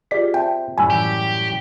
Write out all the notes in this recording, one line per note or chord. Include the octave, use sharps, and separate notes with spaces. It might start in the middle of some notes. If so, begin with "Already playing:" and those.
F4 G4 G#4 D5 B6
C4 E5 G5 A5
F#2 A2 G3 G#5 B5 E6
E3 G4